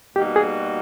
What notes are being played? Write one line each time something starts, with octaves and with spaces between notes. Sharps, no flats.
B2 G3 A#3 D#4 F#4 G4
G#4